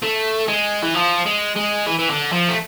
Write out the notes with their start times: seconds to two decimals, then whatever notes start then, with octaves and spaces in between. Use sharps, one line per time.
0.02 A3
0.48 G#3
0.82 E3
0.94 F3
1.26 G#3
1.56 G#3
1.86 E3
1.99 E3
2.10 D3
2.32 F3
2.49 A3